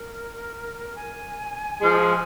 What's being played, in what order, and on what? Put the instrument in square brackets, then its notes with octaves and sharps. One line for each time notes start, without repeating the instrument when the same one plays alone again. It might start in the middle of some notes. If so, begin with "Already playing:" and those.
Already playing: [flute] A#4
G#5
[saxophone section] F3 G#3